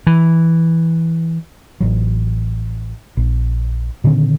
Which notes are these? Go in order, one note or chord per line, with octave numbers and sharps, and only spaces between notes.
E3
A1 F#3
A#1
A#2 D3 D#3 C4